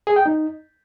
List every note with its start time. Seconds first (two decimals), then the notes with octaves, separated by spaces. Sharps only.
0.07 G#4
0.16 G5
0.26 D#4